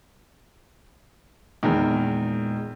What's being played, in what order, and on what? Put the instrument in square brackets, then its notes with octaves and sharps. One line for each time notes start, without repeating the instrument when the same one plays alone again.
[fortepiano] E2 D#3 [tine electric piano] A#2 G#3